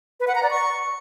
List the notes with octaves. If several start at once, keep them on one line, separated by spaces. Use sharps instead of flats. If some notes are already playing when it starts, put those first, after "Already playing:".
B4
F#5
A#5
D5
C#6